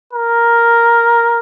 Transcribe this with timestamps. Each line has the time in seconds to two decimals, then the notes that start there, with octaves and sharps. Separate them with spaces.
0.13 A#4